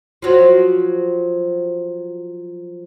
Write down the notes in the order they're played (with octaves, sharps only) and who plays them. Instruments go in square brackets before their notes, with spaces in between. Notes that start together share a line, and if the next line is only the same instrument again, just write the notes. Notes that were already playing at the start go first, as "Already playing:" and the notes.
[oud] F3 F#3